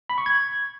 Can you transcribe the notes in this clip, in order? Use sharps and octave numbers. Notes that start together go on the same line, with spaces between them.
B5
C#6
G#6